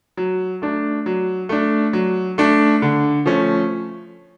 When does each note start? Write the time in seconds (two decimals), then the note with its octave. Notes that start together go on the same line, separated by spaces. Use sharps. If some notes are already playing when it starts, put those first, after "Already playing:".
0.17 F#3
0.62 A3 D4
1.06 F#3
1.49 A3 D4
1.93 F#3
2.38 A3 D4
2.82 D3
3.26 F3 A3 C#4